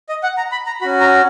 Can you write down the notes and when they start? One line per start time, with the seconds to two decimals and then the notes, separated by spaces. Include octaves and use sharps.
0.09 D#5
0.23 F#5
0.37 A#5
0.52 B5
0.66 A#5
0.81 C#4 F#4 B5
1.00 A#5